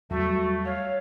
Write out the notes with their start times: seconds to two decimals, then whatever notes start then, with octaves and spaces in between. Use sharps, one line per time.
0.10 E2 F#3 G3 A3 F#4
0.65 C#5 F5